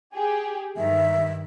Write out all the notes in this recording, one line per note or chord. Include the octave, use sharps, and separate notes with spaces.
G4 G#4
G2 D#3 E5